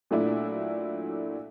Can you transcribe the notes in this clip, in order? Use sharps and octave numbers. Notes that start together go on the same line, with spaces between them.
A#2 F#3 A3 D4 E4